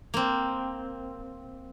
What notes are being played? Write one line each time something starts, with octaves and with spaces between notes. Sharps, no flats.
A#3 C4